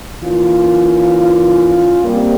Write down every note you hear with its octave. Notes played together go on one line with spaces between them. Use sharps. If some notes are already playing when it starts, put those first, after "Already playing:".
E3 A#3 C#4 F4
C3 G3 A#3